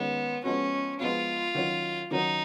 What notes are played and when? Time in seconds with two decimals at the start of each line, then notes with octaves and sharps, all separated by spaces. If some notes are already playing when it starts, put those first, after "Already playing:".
Already playing: D#3 G#3 B3 C#4
0.44 F3 G#3 B3 C#4 F#4
1.00 F3 G#3 B3 F4 F#4
1.55 D#3 F#3 C#4 F#4
2.11 D#3 F#3 C#4 D#4 F#4